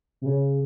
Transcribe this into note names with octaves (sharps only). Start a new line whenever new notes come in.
C3
C#3